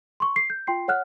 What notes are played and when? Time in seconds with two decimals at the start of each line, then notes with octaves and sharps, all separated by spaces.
0.20 C6 C#6
0.36 C7
0.50 G6
0.67 F4 G5 C6 C7
0.88 C#5 F#5 F6 F#6